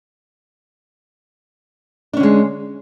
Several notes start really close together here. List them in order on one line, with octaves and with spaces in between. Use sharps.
D4 C#4 D3 G#3